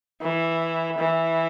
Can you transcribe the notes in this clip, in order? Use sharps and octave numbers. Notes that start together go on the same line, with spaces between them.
E3
E3